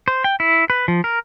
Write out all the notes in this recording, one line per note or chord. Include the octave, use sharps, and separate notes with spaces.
C5
G5
E4
B4
F3
A#4